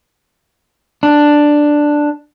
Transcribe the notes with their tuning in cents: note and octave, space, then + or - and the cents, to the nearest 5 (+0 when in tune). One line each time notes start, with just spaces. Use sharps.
D4 +5